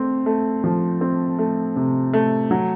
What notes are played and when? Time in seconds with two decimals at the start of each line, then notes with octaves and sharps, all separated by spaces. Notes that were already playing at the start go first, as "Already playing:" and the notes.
Already playing: A3 C4
0.26 A3
0.64 F3
1.01 C4
1.39 A3
1.76 C3
2.13 A3
2.51 F#3